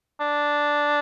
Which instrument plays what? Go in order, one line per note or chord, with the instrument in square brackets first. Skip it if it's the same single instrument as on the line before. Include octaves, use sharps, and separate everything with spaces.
[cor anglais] D4